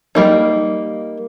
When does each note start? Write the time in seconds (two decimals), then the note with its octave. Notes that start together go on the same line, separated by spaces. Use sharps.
0.15 G3 A#3 D#4